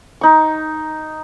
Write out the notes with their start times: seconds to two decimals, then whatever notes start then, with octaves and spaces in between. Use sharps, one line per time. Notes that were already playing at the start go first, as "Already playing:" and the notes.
0.21 D#4 C#6